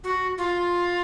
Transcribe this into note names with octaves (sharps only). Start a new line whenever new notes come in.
F#4
F4